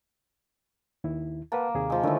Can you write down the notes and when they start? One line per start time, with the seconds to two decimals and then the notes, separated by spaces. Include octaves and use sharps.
1.04 D#2 D#3 E4
1.52 A#3 B4 F#5 A5
1.74 D#2 C3 G#4
1.90 F3 G#3
2.03 A2 D3 D#3 A3